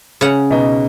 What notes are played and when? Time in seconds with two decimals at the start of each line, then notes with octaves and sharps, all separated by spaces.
0.21 C#3 F#5
0.51 B2 D#4